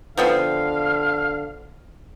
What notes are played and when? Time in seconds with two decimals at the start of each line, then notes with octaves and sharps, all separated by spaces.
0.17 D3 F3 B3 C4 F5